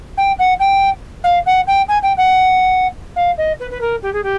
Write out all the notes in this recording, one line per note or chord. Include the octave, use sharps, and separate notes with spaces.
G5
F#5
G5
F5
F#5
G5
G#5
G5
F#5
F5
D#5
B4
B4
A#4
G4
G#4
G4